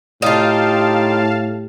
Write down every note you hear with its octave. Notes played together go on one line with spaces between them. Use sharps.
A2 D#4 F4 G4 F5 A5